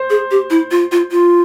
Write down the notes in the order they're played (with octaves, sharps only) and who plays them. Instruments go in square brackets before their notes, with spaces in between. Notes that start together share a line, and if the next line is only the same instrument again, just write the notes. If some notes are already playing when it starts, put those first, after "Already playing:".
Already playing: [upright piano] C5
[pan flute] G#4
G4
E4
F4
F4
F4